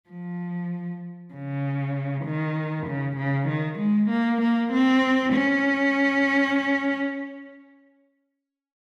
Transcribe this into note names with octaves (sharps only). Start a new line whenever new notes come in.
F3
C#3
D#3
C#3
C#3
D#3
G#3
A#3
A#3
C4
C#4